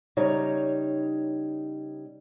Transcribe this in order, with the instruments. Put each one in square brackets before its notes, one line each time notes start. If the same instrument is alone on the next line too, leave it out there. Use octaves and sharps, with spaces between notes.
[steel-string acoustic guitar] C#3 G3 D#4 C#5 A#5